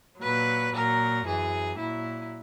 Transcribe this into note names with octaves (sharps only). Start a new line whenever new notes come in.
A#2 F#3 B4
A#2 F#3 A#4
F#2 E3 G#4
A#2 F#3 E4